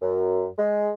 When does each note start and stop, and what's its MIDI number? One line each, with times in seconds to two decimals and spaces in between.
0.02 0.46 42
0.58 0.91 56